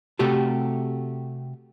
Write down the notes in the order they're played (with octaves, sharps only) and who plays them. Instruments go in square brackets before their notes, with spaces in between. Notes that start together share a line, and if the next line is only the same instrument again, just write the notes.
[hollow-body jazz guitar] C3 A3 F#4 G4 A4